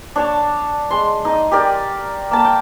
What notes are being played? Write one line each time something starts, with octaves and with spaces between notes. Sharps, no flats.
D4 C#5 A5
G#3 C6
D#4 D#5
G4 A#4 D5
A#3 A5
G5